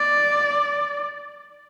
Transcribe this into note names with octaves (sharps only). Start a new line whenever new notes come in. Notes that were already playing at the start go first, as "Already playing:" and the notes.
Already playing: D5